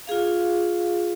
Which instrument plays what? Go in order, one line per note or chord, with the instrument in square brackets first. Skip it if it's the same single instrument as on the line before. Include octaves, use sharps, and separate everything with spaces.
[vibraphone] F4 G#4 F5